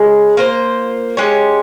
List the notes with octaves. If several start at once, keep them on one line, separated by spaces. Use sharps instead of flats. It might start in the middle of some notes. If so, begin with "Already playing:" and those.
Already playing: C#3 G#3
A#3 F4 C5
G#3 C#4 G4 C#5